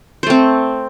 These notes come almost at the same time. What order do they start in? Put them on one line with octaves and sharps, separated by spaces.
C5 A3 C4